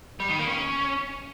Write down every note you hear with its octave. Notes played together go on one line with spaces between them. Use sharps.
G3
D#3
A#3
C#4